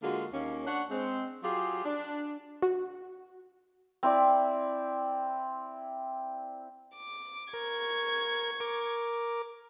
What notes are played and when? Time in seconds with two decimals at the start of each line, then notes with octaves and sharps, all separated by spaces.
0.02 D3 G#3 A#3 F4 F#4
0.32 D#2 A#3 C#4
0.67 D4 C#5 F#5
0.90 G#3 C4
1.43 F#3 F4 G4 G#4
1.85 D4
2.62 F#4
4.03 C4 E4 D5
6.96 D6
7.53 A#4 C#6 G#6
8.60 A#4 D6